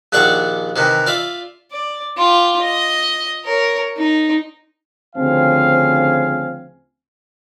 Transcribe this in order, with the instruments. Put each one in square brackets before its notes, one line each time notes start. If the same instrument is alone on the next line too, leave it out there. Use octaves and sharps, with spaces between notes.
[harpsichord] A#1 D#2 D4 D5 F#5 C#6
C3 D#3 E3
F4 D5 E5
[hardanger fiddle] D5
F4 G4
D#5
A#4 C#5
D#4
[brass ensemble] D2 C#3 F3 C4 F5 G#5